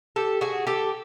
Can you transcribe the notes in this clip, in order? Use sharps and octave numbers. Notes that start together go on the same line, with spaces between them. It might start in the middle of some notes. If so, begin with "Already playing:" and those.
G4 A4
F#4 G#4
G4 A4